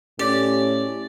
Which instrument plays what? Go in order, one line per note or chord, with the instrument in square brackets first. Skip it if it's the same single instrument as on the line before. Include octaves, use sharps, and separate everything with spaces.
[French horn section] A2 C#4 [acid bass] G4 [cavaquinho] D5